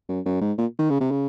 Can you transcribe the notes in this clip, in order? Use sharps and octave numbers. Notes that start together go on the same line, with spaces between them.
F#2
F#2
G#2
A#2
D#3
C#3
C3
C#3